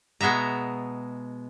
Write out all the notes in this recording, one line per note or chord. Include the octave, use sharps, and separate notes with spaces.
B2 G#3 B3 E5 A#5